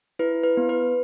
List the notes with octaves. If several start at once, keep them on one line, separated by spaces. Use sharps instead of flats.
E4 B4
B4
B3
B4